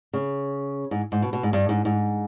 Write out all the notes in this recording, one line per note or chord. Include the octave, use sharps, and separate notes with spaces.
C#3
G#2
G#2
B2
B2
G#2
G2
G#2
G#2